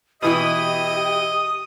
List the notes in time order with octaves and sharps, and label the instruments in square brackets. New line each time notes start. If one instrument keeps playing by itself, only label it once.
[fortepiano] B2 E3 E4 [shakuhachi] G4 [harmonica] D#5 [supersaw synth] D#6